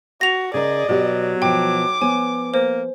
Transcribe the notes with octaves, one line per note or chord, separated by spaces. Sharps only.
F#4 A#6 F7
C#3 G#4 A#4 D5 D#5
B2 F#3 G4
B2 F3 G5 D6
F3 B3 C#5 G#5
A#3 C5